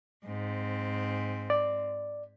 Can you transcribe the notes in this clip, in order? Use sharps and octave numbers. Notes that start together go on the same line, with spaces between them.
G#2 C4
D5